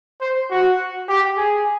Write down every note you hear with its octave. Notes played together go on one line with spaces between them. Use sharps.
C5
F#4
G4
G#4